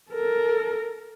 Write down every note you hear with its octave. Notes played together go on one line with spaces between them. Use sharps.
A4 A#4